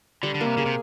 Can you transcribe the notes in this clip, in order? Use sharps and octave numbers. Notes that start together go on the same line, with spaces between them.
D3 G3
D3
A#3
C3
C#3 G#4
C3